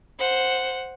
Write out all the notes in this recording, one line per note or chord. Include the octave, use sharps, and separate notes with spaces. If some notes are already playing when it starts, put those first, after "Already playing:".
C5 F#5